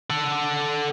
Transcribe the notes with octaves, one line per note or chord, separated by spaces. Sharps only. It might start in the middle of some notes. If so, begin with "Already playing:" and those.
A4 F#5